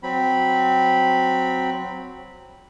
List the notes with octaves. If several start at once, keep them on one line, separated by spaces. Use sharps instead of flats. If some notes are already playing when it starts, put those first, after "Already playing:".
F#3 C4 B5